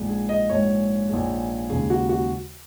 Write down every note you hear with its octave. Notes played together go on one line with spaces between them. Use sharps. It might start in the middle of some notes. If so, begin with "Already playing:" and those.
Already playing: A#1 G#2 G#3
G#4
D#5
A#1 G#2 G#3 C#5
A#1 G#2 G#3
D#2 C#3 G#3 G#4
F#4
F#4